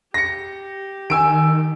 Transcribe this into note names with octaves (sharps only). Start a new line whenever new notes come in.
G4 A#6 C#7
D#3 G#5 E6 D7